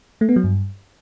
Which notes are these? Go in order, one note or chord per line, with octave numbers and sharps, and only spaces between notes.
A3
B3
F#3
G2